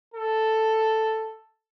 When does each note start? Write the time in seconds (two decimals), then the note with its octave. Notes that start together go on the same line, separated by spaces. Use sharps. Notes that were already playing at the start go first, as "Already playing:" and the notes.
0.14 A4